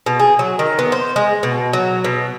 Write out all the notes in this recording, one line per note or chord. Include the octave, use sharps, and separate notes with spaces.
B2
G#4
F#3
D#3
B3
C5
G#3
B2
F#3
B2